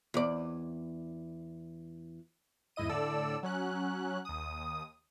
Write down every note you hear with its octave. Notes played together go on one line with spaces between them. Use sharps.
E2 D5
E2 G#2 E4 D#5 D#7
A2 D3 A4 D5 E6
F#3 C#4 F#6
D#2 D#6